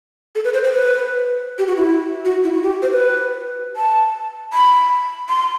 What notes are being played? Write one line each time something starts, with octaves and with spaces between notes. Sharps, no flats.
A4
B4
C5
C5
B4
G4
F#4
E4
F#4
E4
F#4
G4
C5
B4
A5
B5
C6